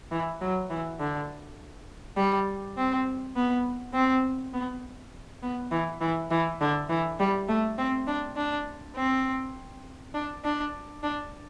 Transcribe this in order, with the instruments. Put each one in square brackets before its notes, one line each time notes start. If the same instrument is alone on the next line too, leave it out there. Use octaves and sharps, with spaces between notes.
[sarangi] E3
F#3
E3
D3
G3
C4
B3
C4
B3
B3
E3
E3
E3
D3
E3
G3
A3
C4
D4
D4
C4
D4
D4
D4